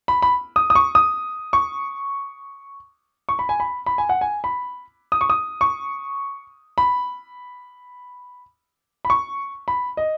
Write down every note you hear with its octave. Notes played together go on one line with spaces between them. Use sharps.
B5
B5
D#6
D#6
C#6
D#6
C#6
C#6
B5
G#5
B5
B5
G#5
F#5
G#5
B5
D#6
C#6
D#6
C#6
B5
B5
C#6
B5
D#5